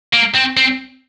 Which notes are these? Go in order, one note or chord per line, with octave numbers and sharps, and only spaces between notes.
A#3
C4
C4